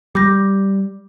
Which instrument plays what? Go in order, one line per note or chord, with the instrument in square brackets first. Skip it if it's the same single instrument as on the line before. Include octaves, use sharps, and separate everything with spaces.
[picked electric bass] G3 [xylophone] D6 G6 A#6